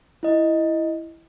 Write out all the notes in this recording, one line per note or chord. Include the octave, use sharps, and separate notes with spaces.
E4 D#5